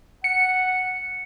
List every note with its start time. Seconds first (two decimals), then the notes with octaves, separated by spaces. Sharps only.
0.24 F#5 C#7